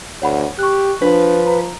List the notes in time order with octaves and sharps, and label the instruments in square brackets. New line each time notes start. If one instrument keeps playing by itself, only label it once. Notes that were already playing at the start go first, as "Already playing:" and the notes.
[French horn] D2 [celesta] C#5 F#5 B5
[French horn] G4 [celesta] C#6 F#6
[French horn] F3 [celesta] D4 [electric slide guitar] B4
[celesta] A#5